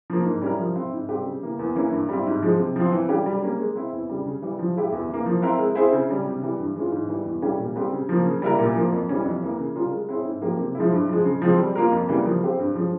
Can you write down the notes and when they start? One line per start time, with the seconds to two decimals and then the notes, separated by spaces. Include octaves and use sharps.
0.10 F3 A#3
0.26 G#2
0.42 G3 C#4 E4 A#4
0.59 F3
0.76 C4 E4
0.93 G#2
1.09 G3 C4 G4
1.26 C#3
1.43 E3 A#3
1.59 E2
1.75 E3 A#3 C#4 E4
1.92 G2
2.09 G3 C4 E4
2.26 G#2
2.42 F3 G#3
2.59 C3
2.76 F3 C4
2.92 E3
3.09 G3 C#4 G4
3.26 G3
3.43 A#3 C#4
3.59 G#3
3.76 C4 E4
3.93 E2
4.10 C#3 G3
4.26 C#3
4.42 E3 G3
4.59 F3
4.76 G#3 E4 G4
4.92 E2
5.09 E3 A#3
5.26 F3
5.42 C4 E4 A#4
5.59 G#3
5.75 C4 E4 G#4 C5
5.92 C#3
6.09 G3 C#4
6.25 C3
6.42 E3 G3
6.59 G2
6.76 E3 G#3 C#4 F4
6.92 G#2
7.08 E3 G3
7.26 E2
7.42 E3 G3 C#4 G4
7.58 A#2
7.76 G3 C4 G4
7.92 C#3
8.09 F3 A#3
8.25 C#3
8.42 G3 A#3 E4 A#4
8.59 A#2
8.75 F3 A#3
8.92 F2
9.09 E3 G3 C#4
9.25 F2
9.43 E3 A#3
9.58 C#3
9.76 G3 C#4 F4 A#4
9.92 G#3
10.09 C4 E4 G#4 C#5
10.25 G#2
10.42 F3 A#3 C#4 G4
10.59 C3
10.75 F3 G#3 E4
10.92 G2
11.09 F3 G#3
11.25 C#3
11.42 F3 G#3 C4
11.59 G3
11.75 A#3 F4 A#4
11.92 F2
12.09 C#3 E3 G3 A#3
12.25 F3
12.42 C4 G4 C5
12.59 G2
12.75 F3 G#3 C#4